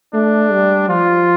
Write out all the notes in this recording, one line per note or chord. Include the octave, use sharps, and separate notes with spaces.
A3 D4
G3
F3 F4